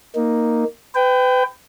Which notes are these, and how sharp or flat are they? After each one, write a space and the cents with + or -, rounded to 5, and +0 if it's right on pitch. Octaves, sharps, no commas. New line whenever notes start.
A#3 +0 D#4 +0
B4 +35 G5 +0